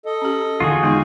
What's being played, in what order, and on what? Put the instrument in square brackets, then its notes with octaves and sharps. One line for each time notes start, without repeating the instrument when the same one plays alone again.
[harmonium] A4 D#5
[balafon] C#4 G4
[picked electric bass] E2 D3 D#3 [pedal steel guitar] F4 F#4 G#4
[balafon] G#3 B3 D#4